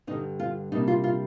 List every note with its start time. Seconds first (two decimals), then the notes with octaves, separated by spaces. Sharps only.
0.07 G2 D3 G3 D#4
0.40 F4
0.72 C3 G3 A#3 D4 D#4
0.88 F4
1.04 F4